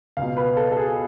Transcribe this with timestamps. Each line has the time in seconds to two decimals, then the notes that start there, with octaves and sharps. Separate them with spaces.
0.17 C#2 B2 F5
0.37 B4
0.56 A4
0.72 A4
0.77 G#4